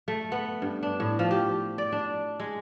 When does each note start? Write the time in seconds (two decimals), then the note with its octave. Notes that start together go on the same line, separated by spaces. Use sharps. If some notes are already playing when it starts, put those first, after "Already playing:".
0.08 A3
0.32 B3
0.62 G2
0.83 D4
1.00 A2
1.19 F3
1.31 G4
1.78 D5
1.92 D4
2.40 G#3